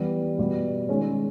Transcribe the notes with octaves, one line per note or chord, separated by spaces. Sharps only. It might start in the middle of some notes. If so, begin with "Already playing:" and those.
Already playing: E3 G3 B3 G4 B4
B2 G3 B3
D#3 G#3 C#4 G#4 C#5